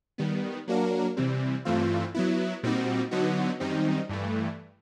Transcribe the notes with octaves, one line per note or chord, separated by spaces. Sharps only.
D#3 G3 B3
F#3 A#3 D4 F#4 A#4
C3 E3 G3 C4
G2 E3 A3 C4 F4
F#3 B3 E4
A#2 G3 C4 D#4 F#4
D3 F#3 B3 D#4 F#4
F#2 D#3 G3 C4 D#4
G2 E3 A3